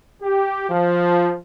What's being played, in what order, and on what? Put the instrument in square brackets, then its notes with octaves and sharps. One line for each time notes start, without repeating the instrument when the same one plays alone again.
[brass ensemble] G4
F3